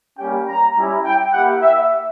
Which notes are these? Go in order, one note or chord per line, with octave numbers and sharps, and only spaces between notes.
G3 A#3 C#4 G4 G5
A#5
G3 C#4 E4
G5
A#3 E4 G4 F#5
E5